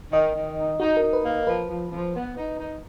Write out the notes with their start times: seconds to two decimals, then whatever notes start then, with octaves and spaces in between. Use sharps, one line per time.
0.12 D#3 D#5
0.35 D#3
0.57 D#4
0.80 D#4 F#4
0.97 A#4
1.03 D#4
1.13 B4
1.24 A#3
1.47 F3 B4
1.69 F3
1.91 F3
2.14 B3
2.36 D#4
2.59 D#4